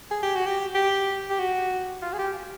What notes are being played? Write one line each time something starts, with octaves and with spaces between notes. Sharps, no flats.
G#4
G4
F#4
G4
G4
G4
F#4
F4
G#4
G4